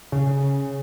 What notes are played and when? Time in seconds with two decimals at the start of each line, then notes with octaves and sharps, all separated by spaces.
0.12 C#3